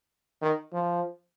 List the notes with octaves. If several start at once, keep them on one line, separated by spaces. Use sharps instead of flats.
D#3
F3